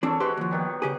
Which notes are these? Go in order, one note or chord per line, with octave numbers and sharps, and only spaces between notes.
E3 C4 D4 G#4 A4 C#5
G#3 F#4 G4 B4 C5
D#2 F3
B2 D#3 G3
C#3 G4 G#4